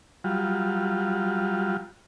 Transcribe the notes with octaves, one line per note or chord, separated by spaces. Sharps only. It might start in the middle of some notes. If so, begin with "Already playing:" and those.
F#3 G3 F4